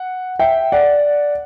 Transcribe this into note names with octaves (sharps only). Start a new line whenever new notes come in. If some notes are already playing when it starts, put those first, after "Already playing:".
Already playing: F#5
E5 G5
D5 F#5